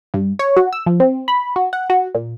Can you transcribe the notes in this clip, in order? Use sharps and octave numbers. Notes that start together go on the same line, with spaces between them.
G2
C#5
F#4
E6
F3
C4
B5
F#4
F#5
F#4
A#2